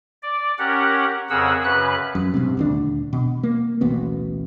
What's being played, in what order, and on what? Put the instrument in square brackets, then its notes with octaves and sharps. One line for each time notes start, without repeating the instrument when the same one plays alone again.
[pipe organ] D5
C#4 G4 A#4 F#5
F2 C#3 G#4 A#4 F#5 E6
F#2 C#3 B4 F#6
[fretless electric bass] F#2
B1 G2 C3
D#1 D2 D4
B2
A#3
D1 A1 B2 B3